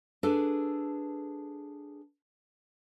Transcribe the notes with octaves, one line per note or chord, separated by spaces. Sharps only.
D4 G#4 A4 B4